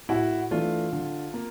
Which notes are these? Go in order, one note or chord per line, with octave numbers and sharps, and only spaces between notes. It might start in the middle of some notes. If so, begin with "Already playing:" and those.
A2 E4 F#4
E3 A3 D4 F4
D3
A#3